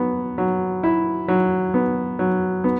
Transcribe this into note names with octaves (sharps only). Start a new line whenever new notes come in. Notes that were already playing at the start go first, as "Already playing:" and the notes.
Already playing: F#3 B3
F#3
E4
F#3
B3
F#3
B3